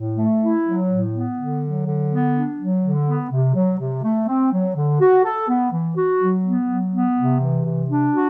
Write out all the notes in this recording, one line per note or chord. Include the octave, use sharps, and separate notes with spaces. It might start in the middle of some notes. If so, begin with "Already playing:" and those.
Already playing: A2
A3
E4
F#3
A2
B3
D3
F#3
D3
B3
D4
F#3
D3
B3
C3
F#3
C3
A3
C4
F#3
D3
F#4
A4
B3
E3
F#4
F#3
B3
F#3
B3
C3
E3
C3
D4
F#4